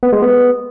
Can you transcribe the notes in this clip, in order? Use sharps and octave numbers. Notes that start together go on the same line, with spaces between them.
B3
G#3
B3